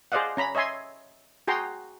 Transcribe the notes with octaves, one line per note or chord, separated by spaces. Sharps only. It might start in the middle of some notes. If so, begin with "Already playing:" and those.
G#4 C5 D5 D#5 F5 F#5
C#4 A#5 B5
C#5 D#5 E5 G#5 C6
F#4 G#4 G5 A#5 C6